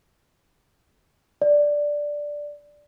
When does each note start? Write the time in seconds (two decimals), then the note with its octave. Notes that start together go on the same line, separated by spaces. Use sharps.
1.42 D5